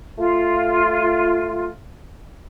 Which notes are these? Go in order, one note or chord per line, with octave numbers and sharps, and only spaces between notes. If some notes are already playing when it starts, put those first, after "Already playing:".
A3 F4